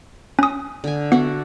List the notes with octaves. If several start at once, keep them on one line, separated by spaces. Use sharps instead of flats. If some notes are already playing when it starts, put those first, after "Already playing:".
C#4 D#6
D3 G#5
B3 F#4 D5 E5